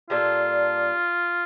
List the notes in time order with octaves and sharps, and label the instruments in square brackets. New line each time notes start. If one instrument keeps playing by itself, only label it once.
[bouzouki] A#2 G3 D4 A4 [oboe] F4